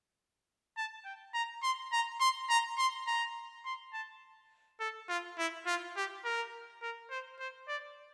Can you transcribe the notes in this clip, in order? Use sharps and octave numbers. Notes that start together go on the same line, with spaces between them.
A5
G5
A#5
C6
A#5
C6
A#5
C6
A#5
C6
A5
A4
F4
E4
F4
G4
A#4
A#4
C5
C5
D5